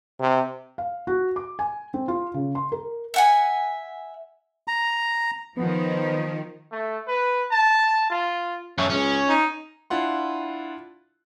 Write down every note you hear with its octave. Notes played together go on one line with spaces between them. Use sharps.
C3
F5
F#4
D6
G#5
C4
F4
C#3
C6
A#4
E5 F#5 G#5
A#5
D#3 F3 B3
A3
B4
A5
F4
F#2 A3 C#4
C#2 C#4
D#4
D4 E4 F4 F#5 C6